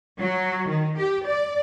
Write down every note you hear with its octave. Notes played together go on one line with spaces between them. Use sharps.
F#3
D#3
G4
D5